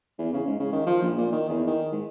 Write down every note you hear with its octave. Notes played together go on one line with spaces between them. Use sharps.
E2
C#3
G#2
C#3
D#3
F3
A#1
A#2
D#3
E2
D#3
G#2